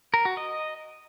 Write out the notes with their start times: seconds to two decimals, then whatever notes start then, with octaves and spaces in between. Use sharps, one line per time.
0.14 A#4
0.25 F#4
0.37 D#5